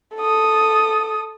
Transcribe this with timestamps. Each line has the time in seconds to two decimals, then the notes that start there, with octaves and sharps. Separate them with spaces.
0.16 A4 D#6